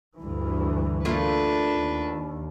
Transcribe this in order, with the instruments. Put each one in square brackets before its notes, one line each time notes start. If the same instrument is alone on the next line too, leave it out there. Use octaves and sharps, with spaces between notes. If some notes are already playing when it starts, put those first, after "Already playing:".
[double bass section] D2 G2 E3
[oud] A3 A#3 F4 [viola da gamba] D4 B4
[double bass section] D#2